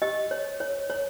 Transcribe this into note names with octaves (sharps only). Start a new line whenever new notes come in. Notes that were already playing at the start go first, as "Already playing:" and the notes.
G4 D#5
C#5
C#5
C#5